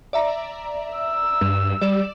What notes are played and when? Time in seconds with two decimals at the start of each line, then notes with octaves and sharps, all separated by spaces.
0.13 D5 E5 A#5
0.94 E6
1.41 G2
1.81 G3 D5 E7